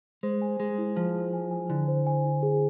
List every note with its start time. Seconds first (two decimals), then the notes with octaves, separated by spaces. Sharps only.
0.23 G#3 C5
0.42 G#5
0.60 G#3 G#4
0.78 E4
0.97 F3 C5
1.14 G#4
1.34 G#5
1.51 G#5
1.70 D3 E4
1.88 C5
2.07 G#5
2.25 E4
2.43 G#4